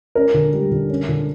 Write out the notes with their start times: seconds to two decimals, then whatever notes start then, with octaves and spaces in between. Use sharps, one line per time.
0.15 C#4 A#4
0.34 D3
0.53 G3
0.71 D3
0.90 C#4
1.09 D3